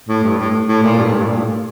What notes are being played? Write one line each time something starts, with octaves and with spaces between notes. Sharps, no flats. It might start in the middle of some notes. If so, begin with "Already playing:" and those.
A2
G2
A2
A2
A#2
G2
A2
G2
A#2
A2